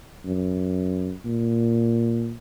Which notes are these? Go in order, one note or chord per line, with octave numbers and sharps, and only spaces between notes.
F#2
A#2